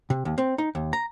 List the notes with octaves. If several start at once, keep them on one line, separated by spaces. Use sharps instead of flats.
C3
D#2
C4
D#4
D#2
A#5